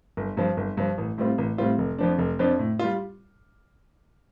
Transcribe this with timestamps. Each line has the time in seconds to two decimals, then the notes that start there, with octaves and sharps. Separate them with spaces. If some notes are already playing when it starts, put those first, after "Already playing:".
0.17 G1
0.37 G2 F3
0.57 G1
0.77 G2 F3
0.98 A1
1.18 A2 G3 C4 F4
1.38 A1
1.58 A2 G3 C4 F4
1.78 F1
1.98 F2 F3 D4
2.18 F1
2.39 F2 F3 D4
2.59 A2
2.79 G3 F4